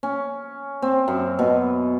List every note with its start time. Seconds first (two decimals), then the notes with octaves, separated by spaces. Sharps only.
0.03 C#4
0.82 C4
1.08 F#2
1.39 B2